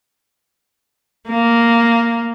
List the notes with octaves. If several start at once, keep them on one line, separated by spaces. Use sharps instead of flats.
A#3